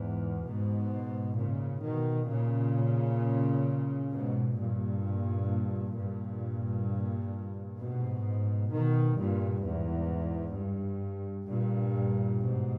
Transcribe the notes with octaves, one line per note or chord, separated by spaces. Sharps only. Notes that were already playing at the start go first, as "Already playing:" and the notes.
Already playing: E2 G#2
G#2 B2
A#2 C#3
B2 D#3
A#2 C#3
G#2 B2
G2 A#2
G2 A#2
G#2 B2
B2 D#3
G2 A#2
E2 G#2
G2
G2 A#2
G#2 B2